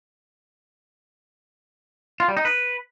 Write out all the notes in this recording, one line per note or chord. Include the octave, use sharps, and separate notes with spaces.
F4
G3
D#4
B4